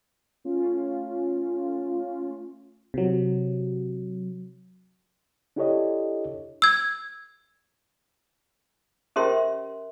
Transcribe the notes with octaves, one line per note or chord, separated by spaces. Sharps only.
A3 C#4 F4
C3 F#3
D4 E4 G4 A4 C#5 D#5
E6 G#6
C#4 G4 A#4 C5 E5 C6